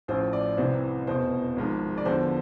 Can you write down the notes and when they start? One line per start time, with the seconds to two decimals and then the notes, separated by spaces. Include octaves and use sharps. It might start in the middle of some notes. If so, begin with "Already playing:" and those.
0.08 A1 A2 F3 C5
0.33 D5
0.57 C2 C3 E3 C5
1.07 F1 E2 B2 C5
1.56 G#1 G#2 F3
1.98 D5
2.05 E2 D3 F3 C5